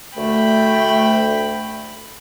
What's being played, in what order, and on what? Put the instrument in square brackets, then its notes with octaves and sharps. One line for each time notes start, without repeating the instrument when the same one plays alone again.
[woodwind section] D2 A3 [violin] G5 B5